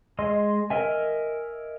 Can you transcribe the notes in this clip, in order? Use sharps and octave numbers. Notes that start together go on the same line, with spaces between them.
G#3 D#5 C6
A#4 D#5 E5 G#5